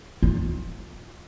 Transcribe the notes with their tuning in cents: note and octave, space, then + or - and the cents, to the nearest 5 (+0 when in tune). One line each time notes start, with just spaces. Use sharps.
F4 +20